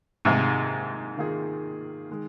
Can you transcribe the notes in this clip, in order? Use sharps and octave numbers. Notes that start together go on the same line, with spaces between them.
G#2 C3 D#3 A#3 F4 G#4
D#3 A#3 F4 G#4
D#3 G#3